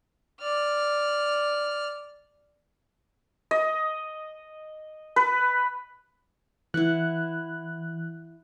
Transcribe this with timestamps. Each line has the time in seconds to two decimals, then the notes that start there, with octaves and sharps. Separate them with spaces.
0.41 D5 F6
3.51 D#5
5.16 B4
6.74 E3 E4 E5 F#5 F#6